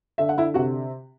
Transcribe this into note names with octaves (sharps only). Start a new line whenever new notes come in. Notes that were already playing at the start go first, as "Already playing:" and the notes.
D3 E5
F#5
D3 E4 E5
C3 F#4 F#5